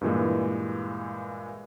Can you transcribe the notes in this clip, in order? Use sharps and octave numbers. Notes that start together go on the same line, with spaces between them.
G2 A#2 E3 G#3